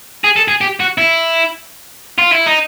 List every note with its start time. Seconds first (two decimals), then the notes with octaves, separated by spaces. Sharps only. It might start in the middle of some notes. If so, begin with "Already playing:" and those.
0.24 G#4
0.36 A4
0.48 G#4
0.61 G4
0.80 F#4
0.98 E4
2.18 F4
2.32 E4
2.46 D#4